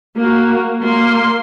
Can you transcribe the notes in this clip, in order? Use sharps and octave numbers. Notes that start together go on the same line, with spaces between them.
A#3 F#4
A#3 C6